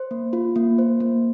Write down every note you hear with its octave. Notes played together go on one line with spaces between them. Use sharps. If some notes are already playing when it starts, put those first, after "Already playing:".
Already playing: C5
A#3
F4
A#3
C5
A#3